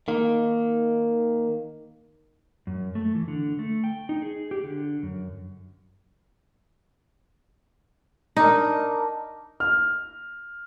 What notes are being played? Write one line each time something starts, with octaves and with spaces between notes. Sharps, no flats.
D#3 A#3
F#2
A3
E3
D3
A3
G5
D#4
G#4
G4
D3
F#2
D4 D#4 A#4
F6